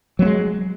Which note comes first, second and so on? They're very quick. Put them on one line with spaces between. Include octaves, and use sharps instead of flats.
F#3 B3 G#3